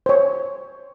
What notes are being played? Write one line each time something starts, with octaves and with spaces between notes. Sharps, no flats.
C5 C#5